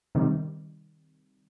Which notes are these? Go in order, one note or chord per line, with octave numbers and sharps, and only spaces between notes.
C3 D#3 G3